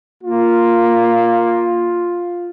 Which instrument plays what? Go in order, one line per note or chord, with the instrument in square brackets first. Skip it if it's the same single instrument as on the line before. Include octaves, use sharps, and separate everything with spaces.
[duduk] A#3 [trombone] F4